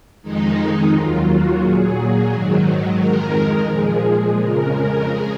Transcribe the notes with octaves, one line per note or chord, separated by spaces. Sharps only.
F2 D#3 G#3 D#4
D#2 D#3 F#3 F4
F#4
A#2 F#3 G#4
G#2 D#3 F#3
F2 D#3 G#3 A#4
A#2 F3 G#3 G#4
F2 C#3 G#3 A#4
G#4